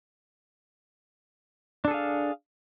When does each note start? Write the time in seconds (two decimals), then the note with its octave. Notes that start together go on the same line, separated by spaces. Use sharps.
1.85 D4
1.88 A4
1.91 G#4
1.94 F5